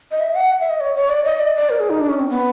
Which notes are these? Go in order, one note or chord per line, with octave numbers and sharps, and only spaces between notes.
D#5
E5
F#5
E5
D#5
C#5
C#5
D5
D#5
D5
D5
A#4
G#4
D#4
D4
C#4
C4
B3